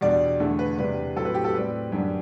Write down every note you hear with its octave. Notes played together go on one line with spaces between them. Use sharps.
E2 B2 G3 D4 D5
E2 D3 A3
B4
E2 C3 G3 D4 B4
A2 F#3 C4 A4
B4
G4
A4
A2 G3 C4 B4
F#2 D3 G3 B3